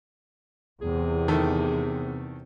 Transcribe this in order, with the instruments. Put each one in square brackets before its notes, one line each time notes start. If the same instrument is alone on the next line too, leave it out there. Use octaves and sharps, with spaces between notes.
[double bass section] E2 C3 [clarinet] G#4
[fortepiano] D#3 A3